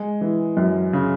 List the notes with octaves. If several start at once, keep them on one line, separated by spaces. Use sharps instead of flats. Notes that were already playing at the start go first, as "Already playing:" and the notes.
Already playing: G#3
E3
F#2
C#3